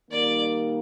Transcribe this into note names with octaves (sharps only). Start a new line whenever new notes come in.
D#3 G3 A#3 D#4 A#4 D5